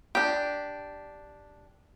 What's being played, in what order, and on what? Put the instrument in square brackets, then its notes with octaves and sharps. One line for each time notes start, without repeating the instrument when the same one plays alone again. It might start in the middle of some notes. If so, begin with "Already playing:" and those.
[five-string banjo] D4 G4